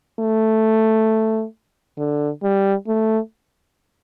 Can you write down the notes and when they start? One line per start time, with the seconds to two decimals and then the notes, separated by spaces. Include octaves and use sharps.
0.20 A3
1.98 D3
2.43 G3
2.87 A3